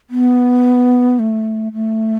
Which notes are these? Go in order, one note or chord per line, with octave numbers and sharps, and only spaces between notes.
B3
A3
A3